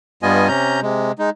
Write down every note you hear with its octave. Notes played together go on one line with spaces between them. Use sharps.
G2 G3 B3 F4 D#5 G#5
C3 C#4 A#5 G6
C3 G#3
G#3 D#4